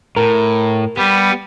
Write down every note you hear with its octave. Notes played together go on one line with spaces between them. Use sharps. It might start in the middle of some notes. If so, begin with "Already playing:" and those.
A2 A#4
G3 B3